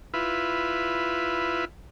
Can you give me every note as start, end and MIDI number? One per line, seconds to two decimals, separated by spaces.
0.14 1.65 64
0.14 1.65 65
0.14 1.65 71